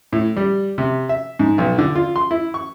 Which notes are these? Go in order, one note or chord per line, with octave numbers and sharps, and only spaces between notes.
A2
G3
C3
E5
G#2
B1
D3
F4
C6
E4
C#6